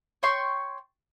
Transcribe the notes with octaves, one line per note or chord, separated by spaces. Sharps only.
C#5 G5 C6 C#6